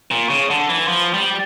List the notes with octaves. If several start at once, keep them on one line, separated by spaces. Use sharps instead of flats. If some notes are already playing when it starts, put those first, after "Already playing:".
A#2
C#3
D3
E3
F3
G3